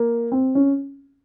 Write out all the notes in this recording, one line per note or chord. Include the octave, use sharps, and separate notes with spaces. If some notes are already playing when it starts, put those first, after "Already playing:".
Already playing: A#3
C4
C#4